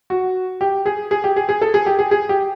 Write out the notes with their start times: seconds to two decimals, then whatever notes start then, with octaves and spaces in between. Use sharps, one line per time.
0.10 F#4
0.61 G4
0.86 G#4
1.11 G#4
1.24 G4
1.36 G#4
1.49 G#4
1.61 A4
1.74 G#4
1.86 G4
1.99 G#4
2.11 G#4
2.29 G4